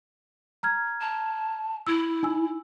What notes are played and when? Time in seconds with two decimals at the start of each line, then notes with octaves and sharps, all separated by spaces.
0.63 A#5 F6 G#6
1.01 A5
1.87 E4 E6
2.23 D#4 G#5 E6